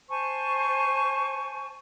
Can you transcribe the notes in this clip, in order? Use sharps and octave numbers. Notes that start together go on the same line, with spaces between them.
C5 G#5 A5 C#6